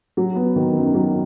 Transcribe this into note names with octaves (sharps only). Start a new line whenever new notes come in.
F#3
B3
D#3
F#2
F#3